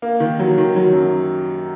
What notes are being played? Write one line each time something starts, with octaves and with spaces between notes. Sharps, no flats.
A#3
D#3
F#3
D#3
F#3
F#2